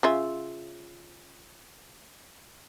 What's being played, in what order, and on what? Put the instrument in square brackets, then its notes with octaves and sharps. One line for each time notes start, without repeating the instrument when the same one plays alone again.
[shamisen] C#3 F4 E5